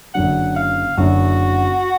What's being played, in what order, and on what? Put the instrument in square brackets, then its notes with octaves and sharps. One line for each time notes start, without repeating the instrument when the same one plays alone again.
[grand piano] F#1 F#2 D3 F#3 [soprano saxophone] F#5
[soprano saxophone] F5
[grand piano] F#1 F#2 D3 F#3 [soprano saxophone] F#4